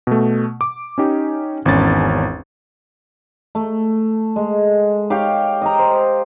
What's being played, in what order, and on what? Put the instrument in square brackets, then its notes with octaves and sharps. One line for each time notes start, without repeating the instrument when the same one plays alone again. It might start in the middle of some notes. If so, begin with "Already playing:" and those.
[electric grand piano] B2 A3
D6
C#4 D#4 G4
G#1 E2 C#4 A6
[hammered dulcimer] A3
G#3
G4 C#5 F5 G5
D#5 G5 A#5
C5